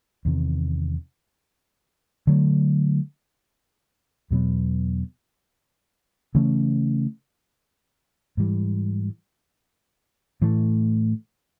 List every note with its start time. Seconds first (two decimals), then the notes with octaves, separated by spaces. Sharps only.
0.25 E2 C3 D#3
2.27 D3 F#3 A3
4.30 E2 B2 F#3 B3
6.35 C#3 E3 A3 C#4
8.37 G#2 E3 G3
10.42 A2 E3 A3